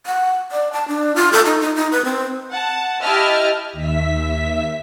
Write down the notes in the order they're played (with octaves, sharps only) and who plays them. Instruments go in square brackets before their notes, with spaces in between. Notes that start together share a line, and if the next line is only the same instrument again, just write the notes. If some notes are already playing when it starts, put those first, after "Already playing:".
[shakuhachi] F#5
D5
A5
D4
F4
A4
D#4
D#4
D#4
B4
C4
[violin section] F#5 A5
E4 G4 D#5 E5 A5 F6
[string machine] D#2 E5 B6